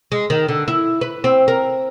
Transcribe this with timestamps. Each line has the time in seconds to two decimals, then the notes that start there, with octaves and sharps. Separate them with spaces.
0.12 G#3
0.30 D#3
0.49 D3
0.68 E4
1.01 B4
1.24 C4
1.48 A#4